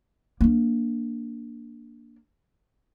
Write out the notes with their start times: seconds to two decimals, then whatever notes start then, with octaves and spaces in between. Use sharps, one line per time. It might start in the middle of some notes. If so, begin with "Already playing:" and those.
0.41 A#3 D4